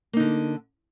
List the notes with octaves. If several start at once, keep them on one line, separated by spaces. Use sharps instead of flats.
D3 A#3 D#4